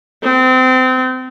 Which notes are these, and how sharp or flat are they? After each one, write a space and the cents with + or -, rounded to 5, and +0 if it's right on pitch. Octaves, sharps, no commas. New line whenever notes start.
C4 -30